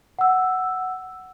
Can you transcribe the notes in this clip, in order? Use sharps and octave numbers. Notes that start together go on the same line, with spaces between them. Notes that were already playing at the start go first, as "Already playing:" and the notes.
F#5 E6